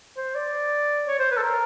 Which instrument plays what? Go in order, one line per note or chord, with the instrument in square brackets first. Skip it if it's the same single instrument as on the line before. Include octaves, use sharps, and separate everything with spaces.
[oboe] C5
D5
C#5
C5
B4
A4
A#4